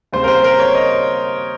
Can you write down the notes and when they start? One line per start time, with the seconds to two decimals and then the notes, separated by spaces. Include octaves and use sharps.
0.12 D#2 C#3 G3 C4 C5
0.24 A#4
0.28 C5
0.44 A#4
0.59 C#5
0.75 D#5